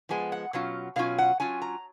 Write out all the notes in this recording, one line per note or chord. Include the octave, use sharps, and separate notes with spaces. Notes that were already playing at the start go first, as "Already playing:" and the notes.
F3 G#3 B3 G#5
F#5
B2 F#3 C#4 F4
B2 F#3 C#4 F4 F5
F#5
F#3 C#4 F4 G#5
A#5